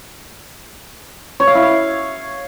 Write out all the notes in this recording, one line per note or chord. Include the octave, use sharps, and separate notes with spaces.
C#5
F5
E4
F5